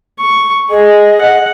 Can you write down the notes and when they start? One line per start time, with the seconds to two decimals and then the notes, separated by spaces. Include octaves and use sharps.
0.20 C#6
0.70 G#4 D#5
1.21 F#5